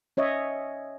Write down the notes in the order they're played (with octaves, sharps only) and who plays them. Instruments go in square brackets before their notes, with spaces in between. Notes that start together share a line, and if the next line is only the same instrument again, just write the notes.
[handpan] C#4 C#5 D#5 E5